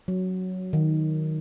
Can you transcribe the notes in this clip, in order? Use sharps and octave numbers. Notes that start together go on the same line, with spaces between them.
F#3
D#3